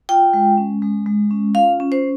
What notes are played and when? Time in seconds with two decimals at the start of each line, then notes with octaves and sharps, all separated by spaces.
0.09 F4 G5
0.33 G#3
0.57 C#4
0.82 G#3
1.06 G#3
1.31 C#4
1.55 F4 F5
1.80 C#4
1.92 C5